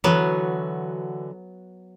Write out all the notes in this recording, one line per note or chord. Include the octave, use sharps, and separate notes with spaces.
D3 E3 F#3 B3 F#4